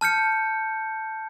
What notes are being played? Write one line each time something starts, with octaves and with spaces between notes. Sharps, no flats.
A5 F6 G6 C#7